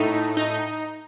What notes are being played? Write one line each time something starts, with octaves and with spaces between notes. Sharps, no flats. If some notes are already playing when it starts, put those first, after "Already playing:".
Already playing: A2 A3 D#4
D#4